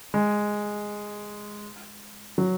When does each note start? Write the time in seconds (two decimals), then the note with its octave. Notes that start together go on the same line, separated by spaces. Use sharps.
0.14 G#3
2.38 F#3